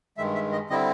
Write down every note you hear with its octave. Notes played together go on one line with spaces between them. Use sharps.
G2 D#3 G#3 E5
E5
D#5
D3 G3 C4 E4 D#5